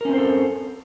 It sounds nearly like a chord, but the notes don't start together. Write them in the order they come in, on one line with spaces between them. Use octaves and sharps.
A#4 C#4 C4 C5 A4